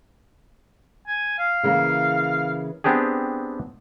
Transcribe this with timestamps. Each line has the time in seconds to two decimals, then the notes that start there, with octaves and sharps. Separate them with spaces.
1.07 G#5
1.39 F5
1.63 C#3 E3 A#3
2.84 B3 C4 D4 G4 G#4